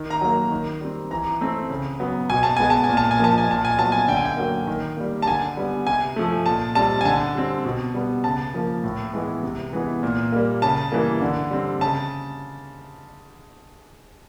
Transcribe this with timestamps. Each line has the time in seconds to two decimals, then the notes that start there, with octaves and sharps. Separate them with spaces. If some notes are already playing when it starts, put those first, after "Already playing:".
Already playing: D#3
0.10 A#5
0.21 F#3 A#3
0.51 D#3
0.81 G3 C4
1.11 E3 A#5
1.41 A3 C4
1.70 C#3
2.00 F#3 B3
2.30 B2 G#5
2.43 A5
2.57 G#3 B3 G#5
2.70 A5
2.84 G#5
2.89 A#2
2.97 A5
3.11 G#5
3.19 F3 A#3 A5
3.38 G#5
3.49 A#2 A5
3.65 G#5
3.78 F#3 B3 A5
3.92 G#5
4.08 D3 G5
4.17 G#5
4.25 G5
4.37 F#3 A#3
4.67 D#3
4.97 G3 A#3
5.22 A5
5.27 D3 G#5
5.57 G3 B3
5.86 C3 G#5
6.16 F3 A3
6.46 A#2 A5
6.75 G3 C4 A5
7.01 G#5
7.05 D3 A5
7.35 G3 C4
7.65 B2
7.94 G3 B3
8.24 C#3 A5
8.54 F3 A#3
8.84 A2
9.14 E3 G#3 B3
9.43 C3
9.73 E3 G#3 B3
10.03 A#2
10.32 G3 A#3
10.62 C#3 A5
10.92 E3 G3 A#3
11.21 D3
11.51 G3 C4
11.81 C#3 A5